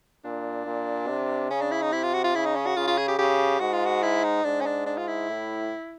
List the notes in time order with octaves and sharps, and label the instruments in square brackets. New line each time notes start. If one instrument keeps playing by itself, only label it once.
[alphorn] A#2 [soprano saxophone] D4
[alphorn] A#2
C3
[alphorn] C#3 [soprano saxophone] C#4
[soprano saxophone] D4
E4
D#4
[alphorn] C3 [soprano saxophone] E4
[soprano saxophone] F4
F#4
F4
[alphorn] C#3 [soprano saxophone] E4
[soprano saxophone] D#4
C#4
F#4
[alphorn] C#3 [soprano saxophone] F4
[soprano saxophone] F4
G#4
G4
[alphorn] C#3 [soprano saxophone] G4
[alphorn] G#2 [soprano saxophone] F#4
[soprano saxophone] F4
F#4
E4
D#4
[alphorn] G#2 [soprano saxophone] D4
[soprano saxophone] C#4
D4
D4
F4
E4
[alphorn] A2